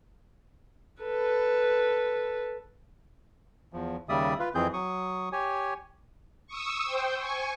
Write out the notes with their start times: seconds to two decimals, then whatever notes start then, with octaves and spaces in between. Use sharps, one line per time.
1.02 A4 B4
3.73 E2 F3
4.09 D#2 C#3 G3 D5 E5 D#6
4.39 F4 B4
4.55 F2 E3 C4 G#4 G6
4.73 F#3 C#6 D#6
5.32 G4 C#5 G#5
6.47 C#6 D#6 E6
6.84 C5 G5
7.17 G#5 C#6